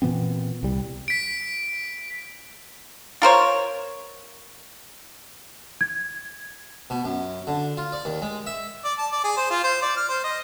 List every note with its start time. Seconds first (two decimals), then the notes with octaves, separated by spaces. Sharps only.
0.02 A#2 E3 B3 C4
0.63 C2 G3
1.08 B6 D7
3.22 F4 A#4 C5 C#5
5.81 G#6
6.90 B2
7.05 F#2
7.47 D3
7.77 F4
7.92 D5
8.05 D#2
8.22 G#3
8.46 E5
8.85 D5
8.98 A5
9.12 D5
9.24 G#4
9.37 C5
9.51 F4
9.64 C5
9.82 D5
9.97 F6
10.09 C5
10.24 D#5